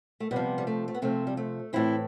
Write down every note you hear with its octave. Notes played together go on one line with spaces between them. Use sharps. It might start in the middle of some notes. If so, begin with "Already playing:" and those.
A3
C3 G3 B3
F3
G3
A3
A3
B3
C3 F3 A3 C4
G3
A3
A2 E3 C4 E4